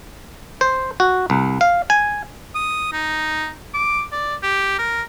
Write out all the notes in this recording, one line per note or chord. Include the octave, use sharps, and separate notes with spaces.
C5
F#4
C2
F5
G#5
D#6
D#4
D6
D5
G4
A#4